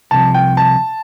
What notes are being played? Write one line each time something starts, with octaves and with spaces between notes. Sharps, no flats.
C2 C3 F3 A5
G5
A5